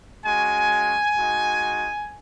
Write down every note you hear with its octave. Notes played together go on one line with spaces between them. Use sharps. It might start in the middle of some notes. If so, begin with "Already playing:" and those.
G#3 C#4 F#4 G#5
G#3 D#4 F#4